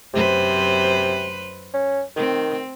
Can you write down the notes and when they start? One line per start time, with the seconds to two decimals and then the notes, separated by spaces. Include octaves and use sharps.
0.14 F#2 C3 B4 C5
1.74 C#4
2.16 D#3 C4